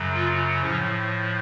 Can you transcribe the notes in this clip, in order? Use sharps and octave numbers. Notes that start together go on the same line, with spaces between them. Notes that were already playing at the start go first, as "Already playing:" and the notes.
Already playing: F#2 C#3 F#3
F4
A2 F3 C#4